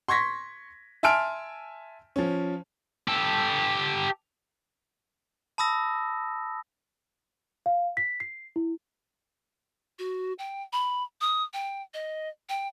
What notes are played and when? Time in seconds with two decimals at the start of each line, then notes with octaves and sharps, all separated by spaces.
0.08 C6 C#6 G#6 A#6 B6
1.03 E5 G#5 A5 C6 F6 D7
2.16 F3 C#4
3.08 G4 A4
5.58 A5 B5 D#6 E6 A#6
7.66 F5
7.97 B6
8.20 C7
8.56 E4
9.99 F#4
10.39 G5
10.73 B5
11.21 D#6
11.54 G5
11.94 D#5
12.49 G5